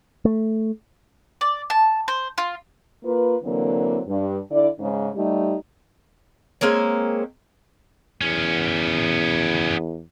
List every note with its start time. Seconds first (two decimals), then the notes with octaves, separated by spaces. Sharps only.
0.25 A3
1.41 D5
1.70 A5
2.08 C5
2.38 F4
3.05 A#3 F4 B4
3.44 D3 E3 F#3 A#3 C4
4.08 G2
4.51 D3 E4 D5
4.80 G#2 C#3
5.15 G3 A3 D#4 G4
6.61 G#3 A#3 C4 C#4
8.21 E2 B3 C#4